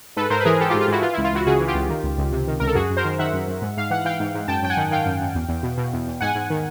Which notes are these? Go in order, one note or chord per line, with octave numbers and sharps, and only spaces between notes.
G#2 A4 B4
G#2 A#4 C5
B4
E3 G#4 A#4
E3 G4 A4
G#2 F4 G4
F4
G#2 E4 F#4
E3 F4
C#2 E4
F4
C#2 E4 F#4
C#3 F#4 G#4
E3
F4 G4
C#2
D#3
C#2
C#2
C3
D#3
C#2 A#4
A4
F#2 F#4 G#4
F#2
A#4 C5
D#3
D#3 E5 F#5
F#2
F#2
G#2
G#2 F5
E3 F#5
E3 F5 G5
G#2
G#2
F#2 G5 A5
F#2 G5
F#5 G#5
D#3
D#3 F5 G5
F#2
F#2
E2
E2
B2
B2
E2
E2
G#2 F#5 G#5
G#2
D#3